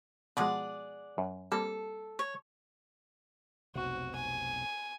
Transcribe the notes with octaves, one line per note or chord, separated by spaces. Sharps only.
B2 F3 G#3 G#4 D5 F#5
F#2
G3 A#3 C4 A4
C#5
F1 B1 C3 F#4
G#5